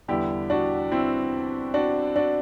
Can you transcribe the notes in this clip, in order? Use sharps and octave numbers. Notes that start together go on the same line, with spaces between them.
E2 D3 G3 E4 G4
D4 F#4
C4 E4
D4 F#4
D4 F#4